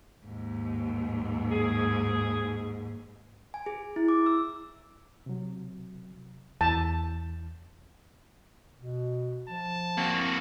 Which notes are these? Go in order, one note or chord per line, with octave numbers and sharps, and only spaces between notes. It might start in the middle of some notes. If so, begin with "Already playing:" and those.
D#2 G#2
G#4
G#5
G#4
E4
D6
E6
C3 F#3
E2 A5 G6
B2
F3 A5
A#3 C4 F#4